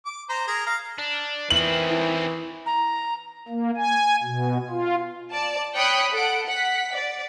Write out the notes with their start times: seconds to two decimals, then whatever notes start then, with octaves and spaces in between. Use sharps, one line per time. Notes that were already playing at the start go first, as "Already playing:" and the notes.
0.06 D6
0.29 C5 A#5
0.48 G#4 A#4 A#5
0.67 F5 A#5
0.98 D4
1.50 D#3 E3 C4 F#7
1.90 E4
2.66 A#5
3.48 A#3
3.77 G#5
4.23 B2
4.70 F4
5.31 D5 A5
5.75 C#5 G5 B5 D#6 F#6 C#7
6.11 A4 F#5 D7
6.47 F#5 B6
6.94 D5